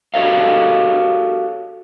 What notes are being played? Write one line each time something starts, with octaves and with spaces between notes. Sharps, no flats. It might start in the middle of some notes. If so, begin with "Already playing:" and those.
F#4 G4 A4 C#5 D#5 F5